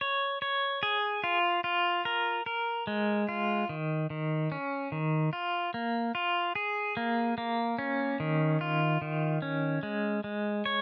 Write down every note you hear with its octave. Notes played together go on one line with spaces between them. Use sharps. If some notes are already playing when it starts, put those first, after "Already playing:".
C#5
C#5
G#4
F4
F4
A#4
A#4
G#3
F4
D#3
D#3
C#4
D#3
F4
A#3
F4
G#4
A#3
A#3
C#4
D#3
F4
D#3
C#4
G#3
G#3
C#5